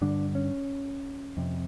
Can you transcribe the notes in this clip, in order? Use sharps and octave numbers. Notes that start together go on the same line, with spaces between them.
G2 D3 D4
C#4
F2 C3